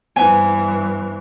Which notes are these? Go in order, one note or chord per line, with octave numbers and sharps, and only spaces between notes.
G2 E3 B3 C4 G#5